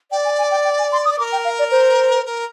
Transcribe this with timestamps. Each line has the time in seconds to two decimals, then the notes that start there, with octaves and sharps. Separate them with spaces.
0.11 D5 G5
0.25 G#5
0.38 G#5
0.51 G5
0.64 G5
0.79 G#5
0.92 C6
1.05 D#6
1.18 A#4 D6
1.32 G5
1.45 F5
1.59 D5
1.71 C5
2.26 A#4